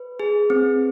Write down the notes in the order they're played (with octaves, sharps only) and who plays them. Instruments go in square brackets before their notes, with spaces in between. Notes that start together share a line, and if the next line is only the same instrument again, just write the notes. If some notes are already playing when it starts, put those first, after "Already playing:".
Already playing: [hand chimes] B4
G#4
C4